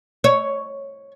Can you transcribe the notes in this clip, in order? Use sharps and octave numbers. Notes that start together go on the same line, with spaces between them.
C#5